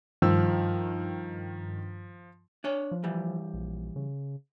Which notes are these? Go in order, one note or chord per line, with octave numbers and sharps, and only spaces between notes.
G2 D#3 F3 E6
D4 C#5
F3
E3 G3
A#1
C#3